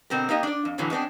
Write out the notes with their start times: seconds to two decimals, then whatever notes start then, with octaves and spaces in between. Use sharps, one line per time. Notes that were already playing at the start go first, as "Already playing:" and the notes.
0.10 B2 D3 C4 G4 A#4
0.29 A#3 D#4 G4 D#5
0.43 D4 D5
0.65 F2
0.78 F#2 A2 D3 E3 F#3
0.90 G#3 B3 C4 D4